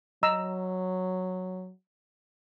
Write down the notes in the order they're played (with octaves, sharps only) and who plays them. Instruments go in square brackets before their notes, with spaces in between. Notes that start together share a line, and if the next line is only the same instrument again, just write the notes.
[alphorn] F#3 [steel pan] D#5 A#5 E6